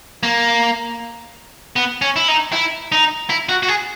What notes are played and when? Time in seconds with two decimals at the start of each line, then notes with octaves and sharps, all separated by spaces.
0.23 A#3
1.76 B3
2.02 C#4
2.16 E4
2.28 D#4
2.53 E4
2.92 D#4
3.30 E4
3.49 F#4
3.63 F#4
3.68 G#4